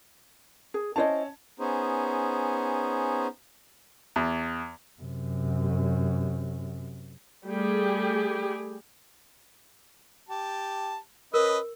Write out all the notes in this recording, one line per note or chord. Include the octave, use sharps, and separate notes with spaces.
G#4
C#4 E4 C5 D#5 A5
B3 C#4 D#4 G#4 C5
E2
F#2 C3
G3 A3 G4 G#4
G4 A5
C#4 A#4 B4 D#5